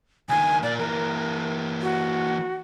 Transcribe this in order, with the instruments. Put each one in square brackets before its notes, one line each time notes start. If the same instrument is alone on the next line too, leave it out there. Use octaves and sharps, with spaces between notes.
[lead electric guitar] C#2 D#3 [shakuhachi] G#5
[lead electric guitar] A#2 A#3 [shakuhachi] D5
[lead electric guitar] E3 A#3 [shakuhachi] A#4
[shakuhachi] F#4